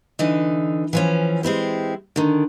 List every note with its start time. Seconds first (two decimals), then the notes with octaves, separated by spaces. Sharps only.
0.19 D3 E3 D#4
0.93 E3 F3 C#4
1.43 G#3 C4 E4 G4
2.16 D3 D#3